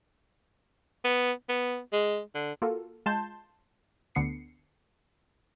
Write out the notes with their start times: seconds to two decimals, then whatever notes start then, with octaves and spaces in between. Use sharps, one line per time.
1.04 B3
1.49 B3
1.93 G#3
2.35 D3
2.62 A#3 F4 F#4 A4
3.06 G#3 F4 A5 C6 G6
4.15 D2 D3 B3 C7 C#7